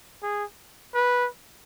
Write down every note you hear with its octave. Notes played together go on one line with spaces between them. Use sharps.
G#4
B4